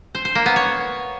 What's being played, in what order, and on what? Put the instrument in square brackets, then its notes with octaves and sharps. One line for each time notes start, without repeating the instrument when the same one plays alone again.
[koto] C5
C5
A#3
B3
C#5